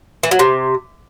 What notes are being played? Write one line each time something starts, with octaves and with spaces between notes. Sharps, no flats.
E3
F#3
C3